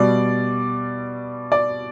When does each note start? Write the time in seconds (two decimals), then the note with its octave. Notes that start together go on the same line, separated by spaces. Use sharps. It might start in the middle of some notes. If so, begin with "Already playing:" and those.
Already playing: B2 G3 D5
1.52 D5